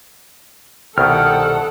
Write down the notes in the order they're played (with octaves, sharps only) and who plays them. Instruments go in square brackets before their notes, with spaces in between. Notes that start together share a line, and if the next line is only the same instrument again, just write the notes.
[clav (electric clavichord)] C2 B2 D#3 [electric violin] A4 F#5 [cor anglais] G5 [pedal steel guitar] F6